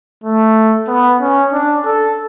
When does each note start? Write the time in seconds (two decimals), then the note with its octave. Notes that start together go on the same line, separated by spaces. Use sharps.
0.24 A3
0.87 B3
1.21 C#4
1.52 D4
1.85 A4